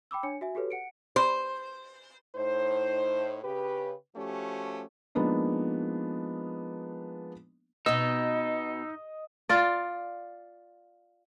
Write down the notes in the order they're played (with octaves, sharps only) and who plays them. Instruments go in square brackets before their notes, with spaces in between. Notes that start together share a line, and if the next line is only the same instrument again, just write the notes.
[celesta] G5 B5 D6 E6
D4 C#5 G#5 C#7
F#4 E5 G#5
F#4 G4 A4 B4 C#5
F#5 C#7 D7
[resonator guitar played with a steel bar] C5
[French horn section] A2 D#4 C5
C#3 G4 B4
F3 A3 C#4 F#4 G4
[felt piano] F3 G#3 A#3 B3 D4 D#4
[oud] B2 B3 [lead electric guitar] D#4 [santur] D#5 [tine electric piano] E6
[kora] F4 D5